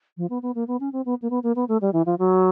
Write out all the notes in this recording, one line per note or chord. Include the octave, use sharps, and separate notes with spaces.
F3
B3
B3
A#3
B3
C#4
C4
B3
A#3
B3
A#3
B3
A3
G3
E3
F3
F#3